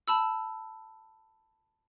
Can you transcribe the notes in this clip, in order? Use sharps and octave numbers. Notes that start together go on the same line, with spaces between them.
A5 B5 E6